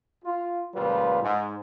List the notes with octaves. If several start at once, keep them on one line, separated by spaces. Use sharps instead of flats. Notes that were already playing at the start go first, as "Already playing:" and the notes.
F4
C#2 A#2 F3 G3 F4 B4
G#2